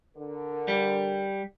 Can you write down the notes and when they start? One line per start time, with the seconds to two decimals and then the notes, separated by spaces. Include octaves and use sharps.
0.17 D3 A#4
0.68 G3